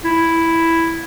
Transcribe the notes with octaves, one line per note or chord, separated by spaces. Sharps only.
E4